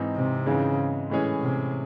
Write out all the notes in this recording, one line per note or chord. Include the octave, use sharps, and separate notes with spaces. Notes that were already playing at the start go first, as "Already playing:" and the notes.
Already playing: G#2 E3 C4 D#4
C3
G#2 C#3 E3 G#3 C4 D#4
A2 E3 G#3 C#4 G#4
C3